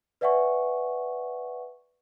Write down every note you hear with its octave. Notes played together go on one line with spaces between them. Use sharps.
B4 D5 E5 F#5 G#5 C#6